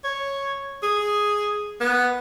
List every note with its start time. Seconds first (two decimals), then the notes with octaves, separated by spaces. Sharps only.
0.04 C#5
0.83 G#4
1.80 B3